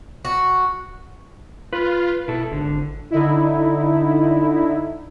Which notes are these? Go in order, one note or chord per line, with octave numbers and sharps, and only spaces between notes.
F#4
F4 B4
B2 E4 A4
G#1 D3
D3 D#4 E4